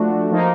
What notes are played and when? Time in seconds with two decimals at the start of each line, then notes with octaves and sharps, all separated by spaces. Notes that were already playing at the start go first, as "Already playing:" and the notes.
Already playing: F3 A3 D4 F#4
0.31 F3 A#3 D#4